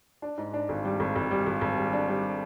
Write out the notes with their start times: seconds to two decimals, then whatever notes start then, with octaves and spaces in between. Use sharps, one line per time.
0.22 D4
0.38 G#2
0.54 D4
0.69 G#1
0.85 G3
1.00 G#1
1.16 G#1
1.31 G3
1.46 G#1
1.61 G#1
1.77 G3
1.93 D4
2.08 G3